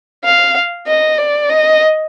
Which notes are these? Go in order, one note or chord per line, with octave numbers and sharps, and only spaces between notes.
F5
D#5
D5
D#5